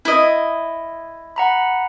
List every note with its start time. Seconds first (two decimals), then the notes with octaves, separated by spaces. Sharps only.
0.05 E4 D#5
1.36 F#5 A#5 B5